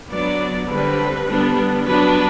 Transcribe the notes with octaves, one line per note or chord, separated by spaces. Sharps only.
F#3 B3 D4 D5
D3 G3 C4 B4
D3 G3 B3 D4
F#3 B3 D4 B4